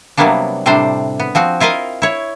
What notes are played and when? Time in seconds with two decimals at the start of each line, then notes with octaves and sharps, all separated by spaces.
0.17 C3 F#3 G3 A#3 B3 D4
0.66 A2 C3 G3 D4 C5
1.20 B3
1.35 F3 C4 F#4
1.60 E4 F4 A#4 D#5 F5
2.02 E4 C#5